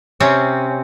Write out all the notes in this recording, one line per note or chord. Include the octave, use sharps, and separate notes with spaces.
C3 C4 C#4